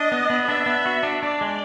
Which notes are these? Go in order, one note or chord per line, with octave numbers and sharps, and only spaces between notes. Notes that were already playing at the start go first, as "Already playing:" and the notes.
Already playing: D4 D#5
B3
B3
D4 E5
B3
F#4
D4
D4 D5
G#3